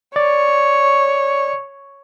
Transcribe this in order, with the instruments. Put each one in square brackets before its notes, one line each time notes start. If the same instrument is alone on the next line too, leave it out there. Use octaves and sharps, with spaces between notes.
[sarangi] C#5 [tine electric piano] D5